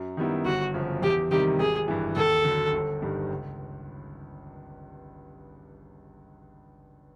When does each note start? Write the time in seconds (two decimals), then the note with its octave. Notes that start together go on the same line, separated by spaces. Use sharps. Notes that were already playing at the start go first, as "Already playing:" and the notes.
Already playing: F#2
0.17 D#3 G3 B3 E4
0.46 G1 F#4
0.74 F#2 C#3 F3
1.02 E2 G4
1.31 C3 D#3 G3 G4
1.59 G#1 G#4
1.88 G2 E3
2.16 D#2 A4
2.45 D3 F#3
2.73 G1
3.02 G2 D#3 G3
3.30 C#2